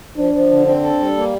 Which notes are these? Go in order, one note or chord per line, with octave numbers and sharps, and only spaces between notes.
F3 D4
F3
D3
C4 D4
A4
G3
A#3